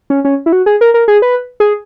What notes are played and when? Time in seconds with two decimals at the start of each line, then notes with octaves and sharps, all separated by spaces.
0.10 C#4
0.25 C#4
0.46 E4
0.52 F#4
0.66 G#4
0.81 A#4
0.94 A#4
1.08 G#4
1.22 B4
1.60 G#4